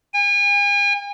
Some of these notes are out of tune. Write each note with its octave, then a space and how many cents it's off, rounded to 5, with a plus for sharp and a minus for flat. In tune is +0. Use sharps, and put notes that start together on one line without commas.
G#5 -40